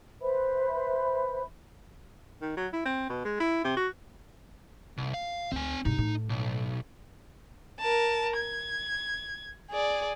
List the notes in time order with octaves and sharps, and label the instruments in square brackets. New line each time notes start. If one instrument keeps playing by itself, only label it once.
[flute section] B4 C5 E5 B5
[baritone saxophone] D#3
F#3
E4
C4
B2
G#3
E4
C3
F#4
[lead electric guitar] C2
F5
[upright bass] D2 [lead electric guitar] C4 G#5
[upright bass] C2 G#2 [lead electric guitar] D#4
[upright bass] A2
[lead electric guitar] B1
[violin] A#4 A5
G#6
G#4 D5